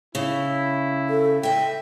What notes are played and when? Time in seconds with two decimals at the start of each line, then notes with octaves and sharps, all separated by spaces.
0.15 C#3 E4
1.09 A4
1.43 D#5 E5 G5